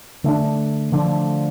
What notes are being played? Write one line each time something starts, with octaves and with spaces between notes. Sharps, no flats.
D3 A3 D4
D3 F3 A3 D4